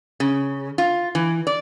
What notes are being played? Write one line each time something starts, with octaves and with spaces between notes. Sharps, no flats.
C#3
F4
E3
D5